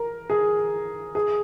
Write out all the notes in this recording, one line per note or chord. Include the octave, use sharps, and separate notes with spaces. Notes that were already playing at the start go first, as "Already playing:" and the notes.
Already playing: A#4
G#4
G#4